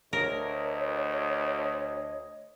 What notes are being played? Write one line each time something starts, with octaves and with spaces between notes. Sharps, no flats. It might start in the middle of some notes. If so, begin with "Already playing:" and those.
D2 A#4 C#5 D#5